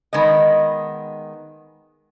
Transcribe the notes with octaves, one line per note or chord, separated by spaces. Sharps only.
D#3 G#3 B3 D#5